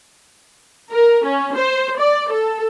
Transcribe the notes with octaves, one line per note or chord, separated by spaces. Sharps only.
A#4
C#4
C5
D5
A4